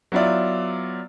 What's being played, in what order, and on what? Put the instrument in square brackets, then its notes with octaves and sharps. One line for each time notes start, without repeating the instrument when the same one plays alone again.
[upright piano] F#3 B3 E4 F4 D5